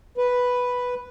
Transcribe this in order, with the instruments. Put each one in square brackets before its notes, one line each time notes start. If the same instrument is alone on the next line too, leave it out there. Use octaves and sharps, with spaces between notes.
[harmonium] B4